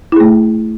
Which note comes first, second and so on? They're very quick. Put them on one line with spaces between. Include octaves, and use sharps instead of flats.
E4 G#4 A3